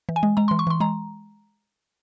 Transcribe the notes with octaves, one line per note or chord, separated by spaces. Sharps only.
E3
G#5
G#3
G#3 A#5
E3 C6
C#6
E3 C6
G#3 A#5